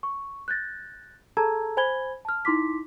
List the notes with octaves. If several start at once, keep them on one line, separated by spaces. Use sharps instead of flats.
C#6
F#6 G6 A6 A#6
G#4 A4 A5 A#5 E6 G#6
C5 G#5 B5 G#6 G7
A5 F6
D#4 E4 C6 D6 B6